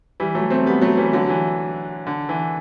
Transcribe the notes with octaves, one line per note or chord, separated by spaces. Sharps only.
E3 G3
F#3 A3
A3 C4
G3 B3
F#3 A3
E3 G3
D3 F#3
E3
D3
E3